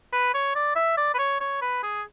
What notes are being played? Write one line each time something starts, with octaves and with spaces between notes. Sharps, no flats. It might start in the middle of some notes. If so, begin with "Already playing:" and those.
B4
C#5
D5
E5
D5
B4
C#5
C#5
B4
G#4